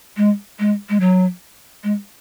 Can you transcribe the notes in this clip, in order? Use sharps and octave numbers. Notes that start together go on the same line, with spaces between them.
G#3
G#3
G#3
F#3
G#3